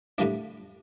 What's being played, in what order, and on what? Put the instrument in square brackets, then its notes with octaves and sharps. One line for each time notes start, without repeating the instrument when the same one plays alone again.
[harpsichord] A2 D3 G3 A#3 D4